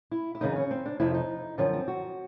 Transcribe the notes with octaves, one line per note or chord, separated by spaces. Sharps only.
E4
E4
F#2 C#3 E3 D#4
C#4
C4
D4
F2 C3 F3 E4
D#4
F#2 D3 F3 C#4
C4
F#4